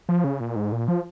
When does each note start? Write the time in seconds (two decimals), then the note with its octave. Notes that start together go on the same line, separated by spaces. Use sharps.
0.09 F3
0.24 C#3
0.40 A#2
0.56 G#2
0.72 A#2
0.88 F3